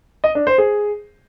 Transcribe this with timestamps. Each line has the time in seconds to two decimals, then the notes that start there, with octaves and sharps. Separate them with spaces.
0.24 D#5
0.35 D4
0.47 C5
0.58 G#4